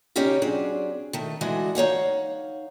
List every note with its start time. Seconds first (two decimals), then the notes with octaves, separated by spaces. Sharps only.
0.16 C#3 C4 C#4 D#4 G4 F5
0.42 F#3 C4 D4 G#4
1.13 D#3 A3
1.41 D3 E3 G#3 D#4 F#4
1.75 D#4 C#5 F5 F#5